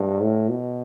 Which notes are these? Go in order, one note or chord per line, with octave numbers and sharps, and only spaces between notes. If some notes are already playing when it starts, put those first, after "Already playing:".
Already playing: G2
A2
B2